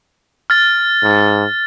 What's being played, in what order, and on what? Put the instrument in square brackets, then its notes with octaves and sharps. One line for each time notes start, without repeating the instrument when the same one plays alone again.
[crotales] F6 A6
[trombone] G#2